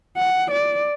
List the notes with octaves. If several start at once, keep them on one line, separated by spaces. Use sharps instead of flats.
F#5
D5